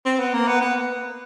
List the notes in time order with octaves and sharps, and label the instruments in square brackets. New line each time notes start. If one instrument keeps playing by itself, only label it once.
[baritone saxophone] C4
B3
A#3
B3
B3